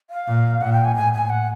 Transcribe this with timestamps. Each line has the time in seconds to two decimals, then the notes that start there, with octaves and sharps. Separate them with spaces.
0.10 F5
0.27 A#2
0.61 A#2 F#5
0.72 G5
0.85 G#5
0.96 A2 G#5
1.13 G#5
1.30 F#5